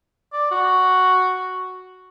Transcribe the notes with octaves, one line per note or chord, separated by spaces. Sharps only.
D5
F#4